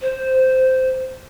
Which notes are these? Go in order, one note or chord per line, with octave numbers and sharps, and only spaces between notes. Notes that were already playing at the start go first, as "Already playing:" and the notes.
C5